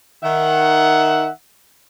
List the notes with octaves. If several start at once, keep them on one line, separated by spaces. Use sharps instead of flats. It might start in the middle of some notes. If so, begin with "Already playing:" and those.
D#3 E5 F#5